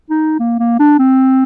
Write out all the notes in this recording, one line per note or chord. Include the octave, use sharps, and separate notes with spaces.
D#4
A#3
A#3
D4
C4